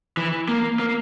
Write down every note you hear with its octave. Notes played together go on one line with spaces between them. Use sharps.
E3
A#3
A#3